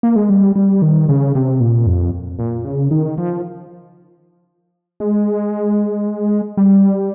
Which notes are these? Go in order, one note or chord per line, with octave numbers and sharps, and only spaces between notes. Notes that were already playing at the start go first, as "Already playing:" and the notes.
A#3
G#3
G3
G3
D#3
C#3
C3
A#2
F2
A#2
C#3
D#3
F3
G#3
G3